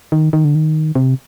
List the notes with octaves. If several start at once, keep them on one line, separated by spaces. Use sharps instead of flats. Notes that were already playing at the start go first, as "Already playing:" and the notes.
D#3
D#3
D3
D#3
C3